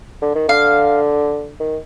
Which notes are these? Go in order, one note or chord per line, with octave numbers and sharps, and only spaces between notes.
D3
D#3
D3 F5
D#3